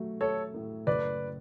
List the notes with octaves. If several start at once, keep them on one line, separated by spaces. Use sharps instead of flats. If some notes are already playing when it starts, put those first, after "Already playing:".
Already playing: F#3 A3
A3 A4 C#5
A2
F#1 B4 D5